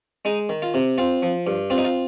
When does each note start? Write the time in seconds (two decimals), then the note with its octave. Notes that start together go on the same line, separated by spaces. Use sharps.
0.25 G#3 D#4
0.49 D#3
0.62 F4
0.74 C3
0.98 C4 F4
1.23 F3
1.47 G2
1.70 C4 F4
1.78 D#4
1.85 F4